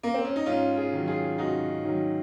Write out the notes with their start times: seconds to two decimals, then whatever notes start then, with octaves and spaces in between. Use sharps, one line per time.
0.03 A#3
0.14 C4
0.25 C#4
0.36 D#4
0.46 G#2 C#4 F4
0.77 F4 G#4
0.93 D#3 F#3
1.07 F4 G#4
1.38 G#2 D#4 F#4
1.85 D#3 F#3